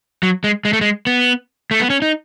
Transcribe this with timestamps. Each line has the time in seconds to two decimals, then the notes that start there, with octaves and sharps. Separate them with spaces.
0.23 F#3
0.44 G#3
0.65 G#3
0.73 A3
0.81 G#3
1.07 B3
1.71 A3
1.80 B3
1.90 C#4
2.02 D#4